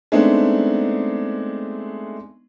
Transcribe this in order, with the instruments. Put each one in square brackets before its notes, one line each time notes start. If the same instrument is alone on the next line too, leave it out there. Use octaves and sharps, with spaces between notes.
[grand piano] G#3 A3 B3 C4 D4 D#4